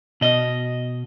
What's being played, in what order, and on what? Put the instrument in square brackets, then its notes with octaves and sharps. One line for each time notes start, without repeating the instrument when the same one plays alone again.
[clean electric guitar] B2 D#5